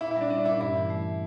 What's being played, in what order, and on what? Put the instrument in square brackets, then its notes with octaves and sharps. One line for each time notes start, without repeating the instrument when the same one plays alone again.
[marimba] A#2 [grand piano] E4
[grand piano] E4
[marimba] G3 [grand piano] D4
[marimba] C#4 [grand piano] D4
[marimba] A#2 [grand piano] E4
[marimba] G2 [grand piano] E4
[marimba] E3
A3